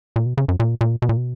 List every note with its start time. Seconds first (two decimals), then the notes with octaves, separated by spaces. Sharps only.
0.16 A#2
0.26 B2
0.38 C#3
0.48 F#2
0.60 A#2
0.81 A#2
1.02 B2
1.09 A#2
1.17 B2